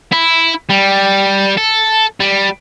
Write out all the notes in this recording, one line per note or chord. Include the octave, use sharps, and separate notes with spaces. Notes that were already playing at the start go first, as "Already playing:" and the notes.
E4
G3
A4
G3